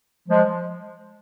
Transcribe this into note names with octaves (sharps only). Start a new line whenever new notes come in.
F3 G#3